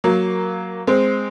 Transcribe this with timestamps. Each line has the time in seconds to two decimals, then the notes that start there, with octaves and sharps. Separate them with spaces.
0.04 F#3 A#3
0.87 G#3 C4